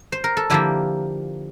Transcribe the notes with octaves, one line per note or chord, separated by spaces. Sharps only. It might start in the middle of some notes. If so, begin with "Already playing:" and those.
Already playing: D5
C5
A#4
A4
D3 F3 A#3 E4 G4